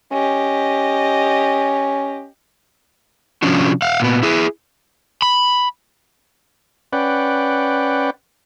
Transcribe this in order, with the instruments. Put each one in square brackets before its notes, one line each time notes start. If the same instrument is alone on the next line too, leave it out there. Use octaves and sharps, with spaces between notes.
[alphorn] C#4 [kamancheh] G4 D#5
[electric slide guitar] C3 F3 C#4 D4 F#4
F5 F#5
A#2 B3
E4 G#4
[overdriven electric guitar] B5
[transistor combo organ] C#4 B4 D5 F#5 G5